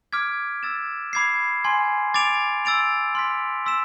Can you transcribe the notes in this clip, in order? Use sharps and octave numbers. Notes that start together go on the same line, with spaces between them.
D6 F6 G#6 B6 D7
E6 A6 E7
B5 D6 G#6 C7
G#5 C6 G#6
D6 A6 D7 F7
C6 E6 A6 D7 F7
C6 F6 B6
C6 E6 B6 E7